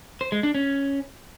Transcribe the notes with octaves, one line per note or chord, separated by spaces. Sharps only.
C5
G#3
D4
C#4